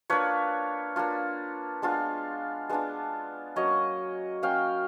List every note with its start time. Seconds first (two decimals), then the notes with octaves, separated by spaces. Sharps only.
0.10 A#3 D4 F4 B4 C#5
0.96 A#3 D4 F4
1.82 G#3 B3 D4 F4
2.70 G#3 B3 D4 F4
3.56 F#3 A#3 C#4 C#5 D#5
4.42 F#3 A#3 C#4 F5 G5